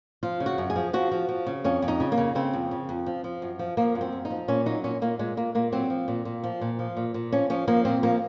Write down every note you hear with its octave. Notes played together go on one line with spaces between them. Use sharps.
F3 F4
C#3
F#4
F#2
G#4
F3
F3 F#4
F3
F3
C#3
F2 C#4
F2
D#4
C#3
A#3
C#3
C#3 C4
F2
C#3
F2
F3
F3
F#2
F3
F3 A#3
F#2
C4
F#2
D#4
F3
A#2 C#4
F#3 D#4
A#2 C#4
A#2 A#3
A#2 G#3
A#2 A#3
A#2 A#3
F#3 C4
F3
A#2
A#2
F3
A#2
F3
A#2
A#2
F3 C#4
F3 C#4
F3 A#3
A#2 C4
F3 A#3